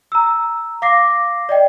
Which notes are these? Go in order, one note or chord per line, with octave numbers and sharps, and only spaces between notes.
A#5 E6
F5 D6 A#6 C7
D5 D#5 G5